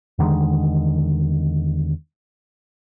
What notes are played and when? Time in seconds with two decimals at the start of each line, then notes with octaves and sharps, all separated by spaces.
0.18 E2 D3 D#3 G#3